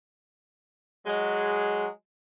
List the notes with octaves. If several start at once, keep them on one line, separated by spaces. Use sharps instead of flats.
F#3 G#3